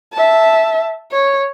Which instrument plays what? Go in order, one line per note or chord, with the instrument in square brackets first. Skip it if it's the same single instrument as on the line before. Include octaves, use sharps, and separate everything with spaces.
[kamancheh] E5 A5
C#5